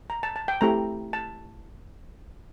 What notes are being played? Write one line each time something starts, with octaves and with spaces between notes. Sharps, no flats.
A#5
A5
A5
G5
A3 C4 E4 G4 A#5
A5